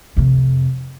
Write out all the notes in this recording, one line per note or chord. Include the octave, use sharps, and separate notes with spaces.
F2 C3